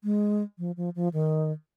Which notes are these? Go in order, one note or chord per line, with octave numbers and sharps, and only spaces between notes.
G#3
F3
F3
F3
D#3